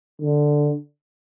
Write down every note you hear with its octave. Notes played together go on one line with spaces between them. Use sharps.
D3